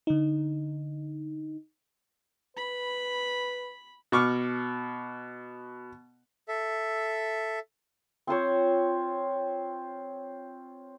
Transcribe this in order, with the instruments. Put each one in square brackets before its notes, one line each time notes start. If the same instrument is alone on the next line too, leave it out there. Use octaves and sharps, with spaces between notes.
[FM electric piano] D3 D#4
[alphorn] B4 [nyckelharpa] B5
[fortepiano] B2 C#6 D6 F6
[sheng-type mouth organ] A4 E5
[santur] C4 F4 C5 C#5